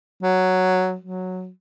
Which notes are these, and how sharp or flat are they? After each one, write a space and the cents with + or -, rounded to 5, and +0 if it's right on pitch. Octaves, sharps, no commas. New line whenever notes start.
F#3 +0
F#3 -5